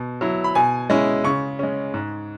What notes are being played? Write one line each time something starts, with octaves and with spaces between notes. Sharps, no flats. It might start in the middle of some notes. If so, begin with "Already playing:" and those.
Already playing: B2
F#3 E4
B5
B2 G#5
G#3 C#4 E4
C#3 C#6
G#3 C#4
G#2